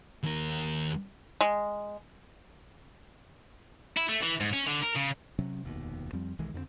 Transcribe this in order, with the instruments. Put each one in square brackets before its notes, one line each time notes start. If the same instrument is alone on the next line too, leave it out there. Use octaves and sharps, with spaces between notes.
[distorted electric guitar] D#2 A#4
[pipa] G#3
[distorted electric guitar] E4
A3
E3
G#2
C#4
D3
A#4
C#3
[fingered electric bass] C3 F#3 C#4
F1 D#2 B2
F2 F3 G3 C4
B1 D#3 E3 G#3
F2 D3 A#3 C4